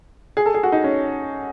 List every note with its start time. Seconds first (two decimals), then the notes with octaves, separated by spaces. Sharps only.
0.37 G#4
0.46 A4
0.54 G#4
0.63 F#4
0.72 D#4
0.84 C#4